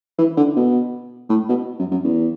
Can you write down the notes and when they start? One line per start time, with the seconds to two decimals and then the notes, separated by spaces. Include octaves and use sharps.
0.18 E3
0.37 D3
0.56 B2
1.29 A2
1.49 B2
1.79 F#2
1.91 F#2
2.04 E2